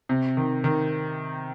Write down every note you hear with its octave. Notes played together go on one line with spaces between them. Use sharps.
C3
D#3
D#3